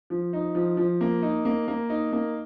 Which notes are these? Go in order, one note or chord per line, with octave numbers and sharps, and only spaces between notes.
F3
D#4
F3
F3
A#3
D#4
A#3
A#3
D#4
A#3